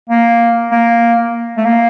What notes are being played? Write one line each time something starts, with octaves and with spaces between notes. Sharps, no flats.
A#3
A#3
A3
A#3